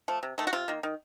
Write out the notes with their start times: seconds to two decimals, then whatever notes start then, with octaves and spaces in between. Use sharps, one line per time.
0.08 F3 A3
0.23 C3
0.38 D#3 A3
0.47 F#4
0.53 C3 F4
0.68 D#3 A#3
0.83 D#3